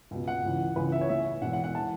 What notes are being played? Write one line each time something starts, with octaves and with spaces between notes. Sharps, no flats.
C#2 B2
F#5
C#2 C#3 E3
C#2 C#3 E3 B4
E5
C#5
A1 A2 E3 E5
E1 E2 E3 F#5
F#5
F#5
A5
E3